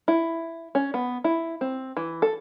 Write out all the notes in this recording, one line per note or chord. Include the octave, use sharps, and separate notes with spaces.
E4
C#4
B3
E4
C4
E3
A4